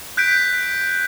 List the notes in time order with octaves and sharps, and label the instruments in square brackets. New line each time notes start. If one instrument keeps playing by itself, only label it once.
[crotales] F#6 G6 B6 D7